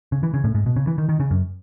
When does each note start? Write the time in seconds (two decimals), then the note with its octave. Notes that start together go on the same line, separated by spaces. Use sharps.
0.12 C#3
0.23 E3
0.34 C#3
0.44 A2
0.55 G#2
0.66 B2
0.76 C#3
0.87 E3
0.98 D#3
1.09 D#3
1.20 C#3
1.31 F#2